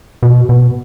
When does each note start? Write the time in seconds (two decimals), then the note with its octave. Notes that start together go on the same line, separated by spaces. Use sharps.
0.23 B2
0.49 B2